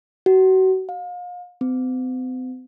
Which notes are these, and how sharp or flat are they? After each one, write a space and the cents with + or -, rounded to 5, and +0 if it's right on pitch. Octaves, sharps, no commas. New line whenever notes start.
F#4 +30
F5 +35
C4 -45